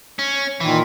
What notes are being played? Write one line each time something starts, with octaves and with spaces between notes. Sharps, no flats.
C#4
A#2 D#3 E3